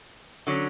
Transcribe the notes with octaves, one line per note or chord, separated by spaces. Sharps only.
D3 F#3 C#4